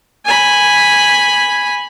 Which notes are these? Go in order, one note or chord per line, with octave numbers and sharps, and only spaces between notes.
G#5 B5